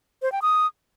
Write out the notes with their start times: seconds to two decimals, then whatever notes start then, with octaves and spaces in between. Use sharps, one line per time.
0.22 C5
0.32 G5
0.42 D#6